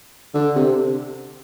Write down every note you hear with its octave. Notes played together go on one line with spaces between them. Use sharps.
D3
C3